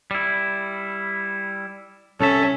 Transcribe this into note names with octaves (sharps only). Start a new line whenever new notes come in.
G3 E4
C2 C#4 A4 E5